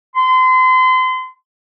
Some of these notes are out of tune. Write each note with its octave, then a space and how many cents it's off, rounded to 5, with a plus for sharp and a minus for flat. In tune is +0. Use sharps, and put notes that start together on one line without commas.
C6 -35